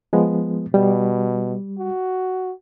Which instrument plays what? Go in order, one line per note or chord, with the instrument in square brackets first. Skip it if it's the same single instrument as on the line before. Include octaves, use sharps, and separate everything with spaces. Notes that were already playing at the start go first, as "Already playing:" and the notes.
[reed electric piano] F3 G#3 B3
[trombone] B2 [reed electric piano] G3
[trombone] F#4